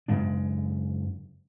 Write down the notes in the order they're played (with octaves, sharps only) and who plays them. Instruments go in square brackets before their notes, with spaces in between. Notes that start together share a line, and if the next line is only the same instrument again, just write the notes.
[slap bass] F#2 C#3 G#3 D4